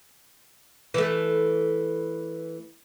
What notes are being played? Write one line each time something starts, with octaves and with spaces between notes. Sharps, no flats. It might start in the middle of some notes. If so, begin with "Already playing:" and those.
E3 A3